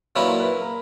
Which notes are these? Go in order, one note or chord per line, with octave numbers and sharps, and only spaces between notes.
A#2 F#3 C#4 E4 B4
A#4
B4
A#4